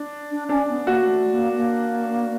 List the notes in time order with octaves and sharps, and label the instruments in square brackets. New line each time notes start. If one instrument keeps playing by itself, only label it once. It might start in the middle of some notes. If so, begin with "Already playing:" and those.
Already playing: [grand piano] D4
[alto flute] D4
[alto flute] C#4 [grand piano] D4
[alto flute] B3
[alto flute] A#3 [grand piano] F#4
[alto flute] A3
A#3
A#3